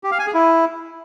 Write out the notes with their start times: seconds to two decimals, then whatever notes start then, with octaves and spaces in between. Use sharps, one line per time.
0.04 G4
0.11 F5
0.19 G#5
0.27 G#4
0.34 E4